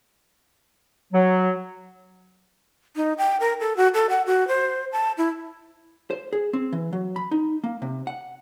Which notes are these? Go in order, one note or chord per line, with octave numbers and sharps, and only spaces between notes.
F#3
D#4
G5
A#4
A4
F#4
A4
F#5
F#4
C5
A5
E4
C5
G#4
C4
E3
F#3
B5
D#4
A#3
C3
F#5